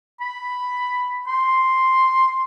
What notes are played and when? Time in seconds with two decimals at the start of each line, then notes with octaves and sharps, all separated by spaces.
0.21 B5
1.28 C6